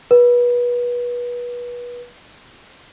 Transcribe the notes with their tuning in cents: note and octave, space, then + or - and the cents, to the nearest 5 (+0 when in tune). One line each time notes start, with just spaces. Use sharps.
B4 -30